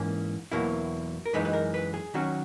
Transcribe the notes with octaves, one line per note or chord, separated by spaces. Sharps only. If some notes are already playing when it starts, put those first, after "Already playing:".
Already playing: G#2 E3 A#3 C#4
E2 B2 F#3 A#3 E4
A#4
F#2 E3 G#3 D#4 B4
B4
A#4
B4
G#4
D#3 F#3 C#4 F#4